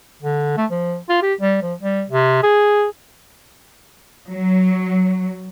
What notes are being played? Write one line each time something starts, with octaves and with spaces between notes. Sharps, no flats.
D3
A3
F3
F4
G4
G3
F3
G3
C3
G#4
F#3